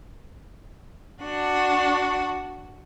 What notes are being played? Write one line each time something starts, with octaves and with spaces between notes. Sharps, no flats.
D4 F#4 F#5